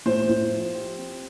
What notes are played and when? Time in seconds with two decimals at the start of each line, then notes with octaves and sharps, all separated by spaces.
0.06 A2 C5
0.29 A2
0.53 F3
0.75 G4
0.98 C4